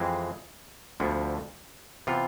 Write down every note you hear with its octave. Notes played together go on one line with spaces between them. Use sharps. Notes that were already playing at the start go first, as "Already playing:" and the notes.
Already playing: F2 E3 G#3 C4
D2 D3 F3 B3
C3 E3 B3 F4